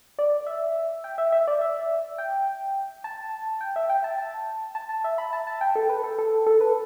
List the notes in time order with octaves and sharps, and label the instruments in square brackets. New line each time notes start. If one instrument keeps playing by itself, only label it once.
[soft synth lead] D5
E5
G5
E5
E5
D5
E5
G5
A5
G5
E5
G5
A5
A5
A5
A5
E5
B5
A5
A5
G5
A4
B4
A4
A4
A4
B4